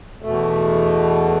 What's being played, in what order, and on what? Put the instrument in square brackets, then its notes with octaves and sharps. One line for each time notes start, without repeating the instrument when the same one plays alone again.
[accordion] E2 B2 A3